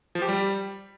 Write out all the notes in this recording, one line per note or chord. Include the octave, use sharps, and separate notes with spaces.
F3
G4
G3